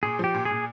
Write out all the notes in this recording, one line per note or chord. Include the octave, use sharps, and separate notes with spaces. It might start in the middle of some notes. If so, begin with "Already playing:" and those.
A#2 G#4
F3 G4
A#2
G#4
A#2